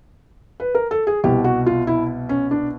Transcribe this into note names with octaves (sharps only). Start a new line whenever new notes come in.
B4
A#4
A4
G#4
C2 B2 G4
F#4
F4
E4
C#4
D4